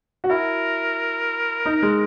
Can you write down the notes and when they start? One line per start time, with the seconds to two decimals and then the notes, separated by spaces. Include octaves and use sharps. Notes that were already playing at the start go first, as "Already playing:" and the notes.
0.24 F#4
0.30 E4 A#4
1.65 D#4
1.82 G#3